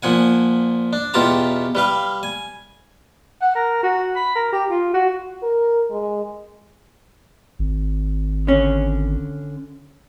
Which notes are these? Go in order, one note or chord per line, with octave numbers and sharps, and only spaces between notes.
A#2 F3 F#5 G#5
D4
E2 B2 F4 G4 A5 A#5
G3 B4 F5
G#5
F#5
A#4
F#4
B5
A#4
G4
F4
F#4
A#4
G#3
G#1
D3 C#4